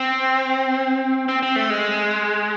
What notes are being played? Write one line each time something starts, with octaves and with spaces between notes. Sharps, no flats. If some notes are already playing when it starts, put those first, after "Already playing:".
Already playing: C4
C4
C4
A3
G#3